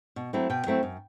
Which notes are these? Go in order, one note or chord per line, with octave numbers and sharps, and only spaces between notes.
B2
F#3 A3 C4 E4
B2 G5
F#3 A3 C4 E4
F#2